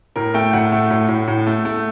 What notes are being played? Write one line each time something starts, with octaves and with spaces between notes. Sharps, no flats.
A2 A#4
A3 G5
A2 F#5
A3
A2
A2
A2
A3
A3